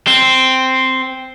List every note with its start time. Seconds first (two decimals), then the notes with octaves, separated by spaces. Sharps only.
0.07 C4